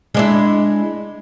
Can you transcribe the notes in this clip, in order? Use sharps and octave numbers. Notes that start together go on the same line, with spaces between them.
G#3 D4 E4